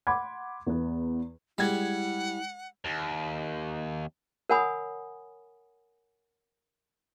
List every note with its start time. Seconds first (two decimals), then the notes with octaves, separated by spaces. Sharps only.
0.07 F#5 B5 C6 D6 G#6
0.67 E2 B3
1.58 G3 G#3 E4 F#5 G#6
2.85 D#2
4.50 A#4 C#5 F#5 G#5 B5 D#6